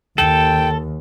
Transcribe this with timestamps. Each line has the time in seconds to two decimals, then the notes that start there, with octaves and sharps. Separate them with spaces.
0.18 D#2 A4 G5